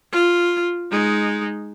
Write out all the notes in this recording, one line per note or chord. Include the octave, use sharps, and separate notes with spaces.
F4
G#3 D#4